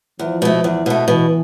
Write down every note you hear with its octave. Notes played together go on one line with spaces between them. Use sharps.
E2 F3
B2 A3
E2
B2 A3
B2 E3